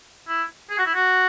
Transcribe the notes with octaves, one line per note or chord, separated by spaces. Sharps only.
E4
G#4
F#4
E4
F#4